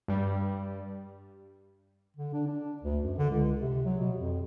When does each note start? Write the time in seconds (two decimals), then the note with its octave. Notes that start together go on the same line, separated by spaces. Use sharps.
0.08 G2 G3
2.17 D3
2.34 D4
2.47 D4
2.83 D2
3.02 F#2
3.18 D3
3.30 C#2
3.61 C3
3.85 F#3
4.00 B2
4.16 F2